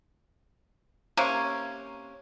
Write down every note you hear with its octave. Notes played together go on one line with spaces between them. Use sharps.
C3 A#3 C#4